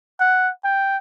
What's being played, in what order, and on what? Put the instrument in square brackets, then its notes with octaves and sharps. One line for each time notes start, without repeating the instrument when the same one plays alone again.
[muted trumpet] F#5
G5